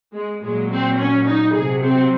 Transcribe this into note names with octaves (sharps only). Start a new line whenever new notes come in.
G#3
A#2 F#3 G#3
C4
C#4
D#4
C3 F#3 G#4
C4